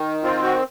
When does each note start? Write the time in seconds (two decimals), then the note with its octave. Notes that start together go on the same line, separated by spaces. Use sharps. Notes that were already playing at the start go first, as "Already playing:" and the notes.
Already playing: D#3
0.24 C4 F4
0.42 F#4